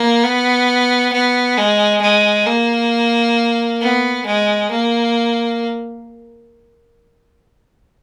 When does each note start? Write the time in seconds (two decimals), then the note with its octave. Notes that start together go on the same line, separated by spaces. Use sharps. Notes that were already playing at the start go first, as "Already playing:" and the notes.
Already playing: A#3
0.24 B3
1.13 B3
1.58 G#3
2.02 G#3
2.47 A#3
3.81 B3
4.27 G#3
4.71 A#3